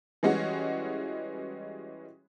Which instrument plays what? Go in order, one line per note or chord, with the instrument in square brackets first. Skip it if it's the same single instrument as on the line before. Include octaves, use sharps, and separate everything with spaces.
[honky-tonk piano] E3 G3 G#3 C#4 F#4